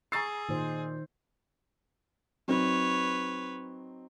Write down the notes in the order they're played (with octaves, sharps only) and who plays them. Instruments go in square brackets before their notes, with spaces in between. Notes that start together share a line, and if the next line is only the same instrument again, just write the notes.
[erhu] G#4 [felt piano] A#5 C#6 E6 [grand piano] A6 C7
[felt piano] A#2 [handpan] D#3 D#4 C5
[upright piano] F#3 C4 D#4 [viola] B4 C#5